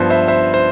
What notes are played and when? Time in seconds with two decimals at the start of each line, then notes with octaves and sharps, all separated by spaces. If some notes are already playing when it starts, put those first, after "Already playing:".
Already playing: G2 F3 B3 B4 C5
0.10 C5 E5
0.27 C5 E5
0.54 C5